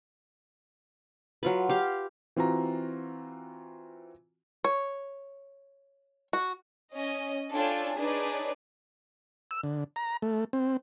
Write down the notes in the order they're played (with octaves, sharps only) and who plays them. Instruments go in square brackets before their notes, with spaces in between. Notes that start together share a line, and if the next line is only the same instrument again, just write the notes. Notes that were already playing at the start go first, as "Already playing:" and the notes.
[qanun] F#3 F4 B4
G4 F5
[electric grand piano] E3 C4 F4 F#4 A#5
[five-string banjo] C#5
F#4
[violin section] C#4 D#5
D4 F4 A4 C#5 G5 G#5
D4 D#4 G#4 B4 C#5 D5
[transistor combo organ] E6
D3
A#5
A3
C4